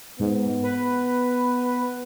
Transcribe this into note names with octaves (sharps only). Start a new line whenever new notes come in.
G#2 B3
B4